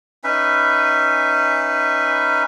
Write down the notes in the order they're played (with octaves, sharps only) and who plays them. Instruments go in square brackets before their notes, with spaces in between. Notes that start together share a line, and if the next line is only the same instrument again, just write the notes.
[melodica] C#4 D#4 B4 E5